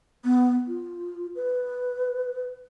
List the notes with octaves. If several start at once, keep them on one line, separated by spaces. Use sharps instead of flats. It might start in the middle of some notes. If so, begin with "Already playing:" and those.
B3
F4
B4